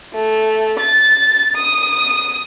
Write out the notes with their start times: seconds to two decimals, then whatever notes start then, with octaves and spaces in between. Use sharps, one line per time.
0.14 A3
0.79 A6
1.55 D#6